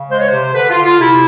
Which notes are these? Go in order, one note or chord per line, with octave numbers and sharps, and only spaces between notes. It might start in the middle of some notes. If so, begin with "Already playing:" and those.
Already playing: C#3
G#3 C5
C#5
C5
C3
D3 B4
F4
D3
F4
C3 E4